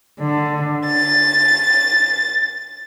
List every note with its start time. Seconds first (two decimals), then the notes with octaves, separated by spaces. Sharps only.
0.20 D3
0.87 A6